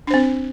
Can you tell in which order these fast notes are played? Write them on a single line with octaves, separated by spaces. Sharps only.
D4 C5 C4